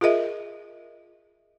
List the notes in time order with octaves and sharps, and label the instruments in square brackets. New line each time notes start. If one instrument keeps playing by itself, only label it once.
[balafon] F4 G#4 A#4 D#5 E5